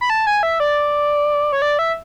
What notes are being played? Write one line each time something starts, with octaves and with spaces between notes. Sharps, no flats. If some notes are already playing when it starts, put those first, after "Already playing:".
B5
A5
G#5
E5
D5
C#5
D5
E5